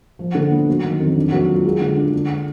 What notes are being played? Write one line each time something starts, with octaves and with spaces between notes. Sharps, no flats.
F3
D3
B3
F#3
D#3
F2
D4
F#3
F4
G#3
D3
D4
D3